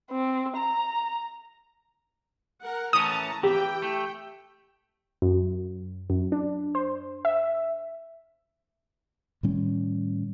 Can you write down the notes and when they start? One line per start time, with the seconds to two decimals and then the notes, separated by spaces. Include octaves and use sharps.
0.11 C4
0.57 A#5
2.61 A#4 F#5
2.93 A2 E3 C#4 A5 A#5 D#6
3.43 E3 G4 G5
3.82 A3
5.22 F#2
6.10 F#2
6.32 D4
6.75 C5
7.25 E5
9.43 A2 D#3 G3 C#4